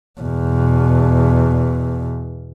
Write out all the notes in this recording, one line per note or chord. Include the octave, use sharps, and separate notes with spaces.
E2 B2